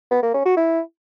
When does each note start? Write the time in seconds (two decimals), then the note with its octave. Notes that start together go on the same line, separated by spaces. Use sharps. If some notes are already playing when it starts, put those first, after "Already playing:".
0.11 B3
0.22 A#3
0.34 C#4
0.45 F#4
0.57 E4